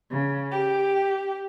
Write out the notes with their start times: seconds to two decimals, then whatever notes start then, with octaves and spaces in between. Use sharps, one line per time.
0.10 C#3
0.52 G4